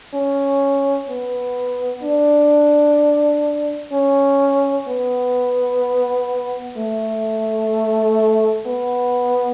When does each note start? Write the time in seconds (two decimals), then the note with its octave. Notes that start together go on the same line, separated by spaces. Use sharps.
0.14 C#4
1.09 B3
2.03 D4
3.92 C#4
4.88 B3
6.77 A3
8.67 B3